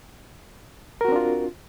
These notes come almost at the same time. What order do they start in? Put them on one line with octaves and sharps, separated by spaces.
A#4 F#4 C4 D4 F4